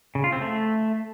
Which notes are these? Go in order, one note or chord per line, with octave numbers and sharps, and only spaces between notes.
C#3
F4
C4
A3